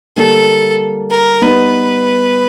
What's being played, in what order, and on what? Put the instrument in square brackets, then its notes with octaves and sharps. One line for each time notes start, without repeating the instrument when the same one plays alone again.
[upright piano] D3 G3 A#3 [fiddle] A4
[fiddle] A#4
[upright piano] G3 B3 D#4 [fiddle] B4